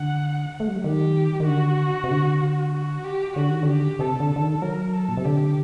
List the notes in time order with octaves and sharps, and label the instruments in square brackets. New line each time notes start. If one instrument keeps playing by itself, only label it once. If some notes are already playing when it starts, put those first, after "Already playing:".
Already playing: [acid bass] D3 [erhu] F#5
[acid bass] A3
G3
F#3
[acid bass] D#3 [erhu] G4
[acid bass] D#3
[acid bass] D3 [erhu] F#4
[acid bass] C3
D3
[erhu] F#4
G4
[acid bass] D3 [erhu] F#4
[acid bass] D#3
D3
[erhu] G4
[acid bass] C3 [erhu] A4
[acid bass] D3
[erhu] A4
[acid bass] D3
D#3
[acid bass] F#3 [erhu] A#4
[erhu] A4
[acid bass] A#2
C3
[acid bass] D3 [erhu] G4